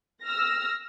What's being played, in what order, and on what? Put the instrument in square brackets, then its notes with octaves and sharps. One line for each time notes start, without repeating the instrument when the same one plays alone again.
[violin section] E6 F6 A#6